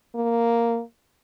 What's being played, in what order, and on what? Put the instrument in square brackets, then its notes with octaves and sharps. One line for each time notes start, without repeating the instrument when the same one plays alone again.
[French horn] A#3